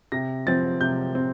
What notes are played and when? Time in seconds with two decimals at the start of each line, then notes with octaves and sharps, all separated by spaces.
0.12 C3 A#6
0.46 F3 C4 A6
0.81 C3 G6
1.15 C4